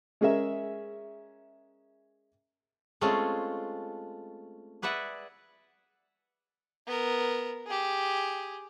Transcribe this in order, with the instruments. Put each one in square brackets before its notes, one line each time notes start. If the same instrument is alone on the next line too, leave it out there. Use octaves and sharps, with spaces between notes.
[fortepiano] G#3 C#4 G#4 A#4 E5
[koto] G#3 A3 C4 C#4 F4 A4
G#4 B4 D5 E5 F#5
[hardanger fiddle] B3 A#4
G4 G#4